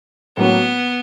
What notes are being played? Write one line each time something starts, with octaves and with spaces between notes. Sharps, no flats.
A2 F#3 A#3 B3 C#4 F#4